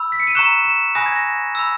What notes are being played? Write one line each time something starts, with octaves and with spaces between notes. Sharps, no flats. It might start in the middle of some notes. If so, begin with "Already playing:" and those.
Already playing: B5 E6
B6
C#7
D#7
A#5 C#6 F#6 E7
E7
G#5 B5 D#6 F#6 A#6
G#6
A#6
B5 E6